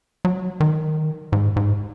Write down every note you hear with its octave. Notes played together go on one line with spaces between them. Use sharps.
F#3
D#3
G#2
G#2